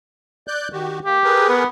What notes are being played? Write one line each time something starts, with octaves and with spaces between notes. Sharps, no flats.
D5 F#6 G6
D#3 F#4 G4
A#3 G4
G#4 A#4 B4
B3